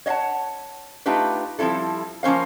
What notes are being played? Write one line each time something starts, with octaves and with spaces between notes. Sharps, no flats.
C#5 D#5 F5 F#5 A5
A3 D4 D#4 F4 G4 B4
F3 G3 C4 E4 A4
F3 A#3 C#4 C5 F5